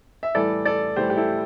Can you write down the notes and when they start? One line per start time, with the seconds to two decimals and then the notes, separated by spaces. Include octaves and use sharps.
0.23 E5
0.35 A2 E3 G3 A4 D5
0.65 A4 D5
0.96 A2 E3 G3 G4 C5
1.10 G4
1.17 E4 A4